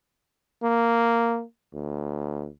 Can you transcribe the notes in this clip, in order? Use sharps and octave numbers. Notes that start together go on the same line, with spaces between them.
A#3
D2